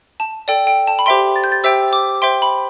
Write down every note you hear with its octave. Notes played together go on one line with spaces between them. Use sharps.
A5
A4 D5 G5
G5
A5
B5
G4 C5 E5 G5 C6
A6
G6
A6
G4 C5 E5 G5 E6
D6
C5 E5 G5 C6
B5